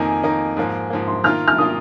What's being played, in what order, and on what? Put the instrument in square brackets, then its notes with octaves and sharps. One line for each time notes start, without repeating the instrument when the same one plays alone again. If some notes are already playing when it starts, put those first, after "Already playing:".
Already playing: [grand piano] F2 D#3 A#3 D#4 [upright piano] G#5
[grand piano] F2 D#3 A#3 D#4
G#2 F3 A#3
G#2 F3 A#3
[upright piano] C6
[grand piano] D#3 A#3 F4 [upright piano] F6
[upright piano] F6
[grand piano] D#3 A#3 F4 [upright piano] D#6